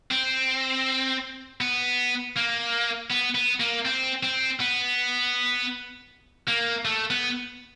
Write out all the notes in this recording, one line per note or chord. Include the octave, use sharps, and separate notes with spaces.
C4
B3
A#3
B3
B3
A#3
C4
C4
B3
A#3
A3
B3